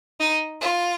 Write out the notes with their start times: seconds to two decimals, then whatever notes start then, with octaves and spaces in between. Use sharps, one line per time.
0.20 D#4
0.61 F4